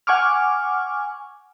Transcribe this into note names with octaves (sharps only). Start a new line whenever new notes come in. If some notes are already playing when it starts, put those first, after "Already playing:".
F#5 G#5 C#6 D6 F6